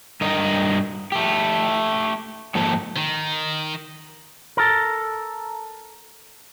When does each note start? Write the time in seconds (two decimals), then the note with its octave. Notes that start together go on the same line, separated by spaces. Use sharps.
0.21 G2 A#4 D#5
1.12 A3 G4
2.55 G#2 D#3 F3 A#3 A4 A5
2.96 D#3
4.57 A4 A#4